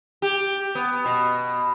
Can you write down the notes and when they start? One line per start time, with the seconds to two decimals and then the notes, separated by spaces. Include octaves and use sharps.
0.22 G4
0.75 B3
1.06 B2